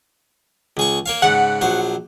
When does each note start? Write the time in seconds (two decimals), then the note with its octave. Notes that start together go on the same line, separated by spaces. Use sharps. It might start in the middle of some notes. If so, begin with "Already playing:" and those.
0.77 C#2 G#4 C#6
1.06 A#3 C#5 F5
1.22 G#2 C#3 F#5
1.61 A#1 F#3 C5